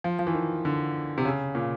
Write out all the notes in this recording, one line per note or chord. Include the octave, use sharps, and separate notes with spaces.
F3
F3
E3
D#3
D3
C3
C#3
A#2